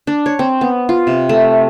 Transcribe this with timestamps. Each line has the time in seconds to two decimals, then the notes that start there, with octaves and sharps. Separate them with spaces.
0.07 D4
0.26 C#5
0.39 C4
0.61 B3
0.89 F4
1.07 C3
1.29 A3